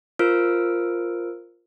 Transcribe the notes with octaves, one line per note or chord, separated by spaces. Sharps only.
F4 A#4 C5 E6 F6 D7